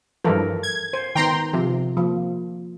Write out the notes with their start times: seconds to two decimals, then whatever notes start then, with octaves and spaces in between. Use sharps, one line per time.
0.24 G2 E3 F3 A4 A#4
0.63 G#6
0.93 C5
1.15 D#3 B3 G5 A#5 C6
1.53 C3 F3
1.97 F3 A#3